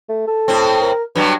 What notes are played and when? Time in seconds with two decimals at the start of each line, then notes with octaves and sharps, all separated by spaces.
0.09 A3
0.27 A4
0.48 A2 C4
0.82 A#4
1.15 G2 F#3 G3 B4